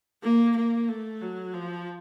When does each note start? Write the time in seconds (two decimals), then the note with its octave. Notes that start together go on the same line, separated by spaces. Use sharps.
0.23 A#3
0.55 A#3
0.89 A3
1.21 F#3
1.53 F3